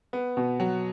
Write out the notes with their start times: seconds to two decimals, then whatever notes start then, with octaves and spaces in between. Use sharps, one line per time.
0.13 B3
0.37 B2
0.60 F#3